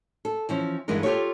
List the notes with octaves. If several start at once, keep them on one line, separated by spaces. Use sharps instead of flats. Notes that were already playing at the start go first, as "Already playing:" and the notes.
A4
E3 F3 C#4
G2 D3 E3 G#3 B3 A#4
F4 G4 A4 C#5